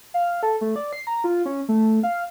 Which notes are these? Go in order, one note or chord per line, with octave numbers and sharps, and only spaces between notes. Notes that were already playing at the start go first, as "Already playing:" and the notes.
F5
A4
A3
D5
C7
A#5
F4
C#4
A3
F5